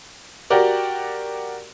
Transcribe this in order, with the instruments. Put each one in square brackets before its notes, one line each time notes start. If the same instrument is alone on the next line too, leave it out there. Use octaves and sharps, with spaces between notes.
[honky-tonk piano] F#4 G4 A#4 D5